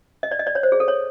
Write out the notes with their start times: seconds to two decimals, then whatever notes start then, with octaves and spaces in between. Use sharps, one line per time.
0.23 D#5
0.31 D5
0.39 D#5
0.47 D5
0.55 C#5
0.63 C5
0.72 G#4
0.80 A4
0.88 C#5